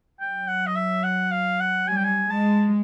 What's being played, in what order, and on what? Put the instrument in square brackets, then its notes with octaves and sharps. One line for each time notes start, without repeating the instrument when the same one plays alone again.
[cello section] F#3 [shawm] G5
[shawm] F#5
D#5
E5
F#5
F5
F#5
[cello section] G3 [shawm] G#5
[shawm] G5
G#5
[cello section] G#3 [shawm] A5